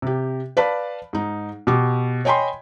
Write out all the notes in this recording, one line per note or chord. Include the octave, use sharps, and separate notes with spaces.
C3 G4
B4 D5 F5 A5 B5
G#2 D#4
B2 G4 D6
C#5 D#5 G5 G#5 B5 C6